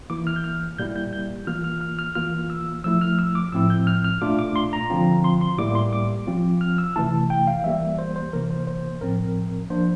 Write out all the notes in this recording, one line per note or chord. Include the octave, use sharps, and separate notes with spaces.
E3 A#3 E4 D6
F6
G6
F6
A#2 G3 A#3 E4 G6
G6
G6
E3 A#3 F4 F6
F6
F6
F6
E3 A#3 F4 F6
E6
F3 A3 E4 E6
F6
E6
D6
A2 F3 C4 E4 E6
G6
F6
F6
A#2 A3 D4 F4 D6
D6
C6
A#5
D3 F3 C4 F4
C6
C6
A2 G3 A#3 E4 D6
C6
D6
F3 C4 F4
F6
E6
C3 E3 A3 E4 A5
G5
F5
E3 G3 A#3 E5
C5
C5
C3 E3 A#3 A#4
C5
C5
A2 F3 C4 A#4
F3 A#3 D4 C5